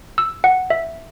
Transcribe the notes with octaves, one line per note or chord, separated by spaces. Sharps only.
E6
F#5
E5